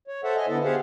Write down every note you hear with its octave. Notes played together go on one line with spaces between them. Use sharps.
C#5
A4 C5 E5 F#5
D#5 G#5
D3 B3 E4 A4
G4 G#4 C5 F5 F#5